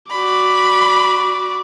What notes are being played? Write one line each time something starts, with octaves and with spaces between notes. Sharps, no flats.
F#4 D5 B5